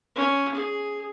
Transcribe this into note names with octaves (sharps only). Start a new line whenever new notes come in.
C#4
G#4